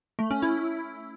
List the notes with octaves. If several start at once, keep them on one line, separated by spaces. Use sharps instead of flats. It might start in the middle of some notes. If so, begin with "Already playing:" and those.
A3
C#4
E4